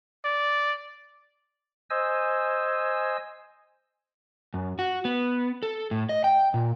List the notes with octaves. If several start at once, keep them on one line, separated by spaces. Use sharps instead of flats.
D5
C5 D#5 G#5 E6
F#2
F#4
B3
A4
A2
D#5
G5
A#2